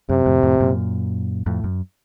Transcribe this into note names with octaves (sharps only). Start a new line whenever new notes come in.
F#2 C3
F2 A2
F2 A2
F#2 A#2
F2 A2
F#2